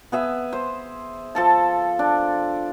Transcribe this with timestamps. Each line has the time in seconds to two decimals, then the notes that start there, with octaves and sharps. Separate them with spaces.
0.12 B3 G#4 E5
0.53 C5
1.35 F3 A4 A5
1.99 D4